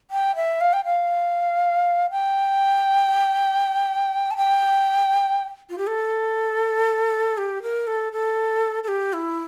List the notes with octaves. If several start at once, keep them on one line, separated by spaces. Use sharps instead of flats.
G5
E5
F5
G5
F5
G5
A5
G5
F4
G4
A4
G4
A#4
A4
A4
A4
G4
E4